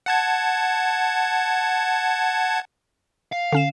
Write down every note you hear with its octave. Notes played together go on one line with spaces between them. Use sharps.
F#5 A5 G#6
F5
D3 C#4 E7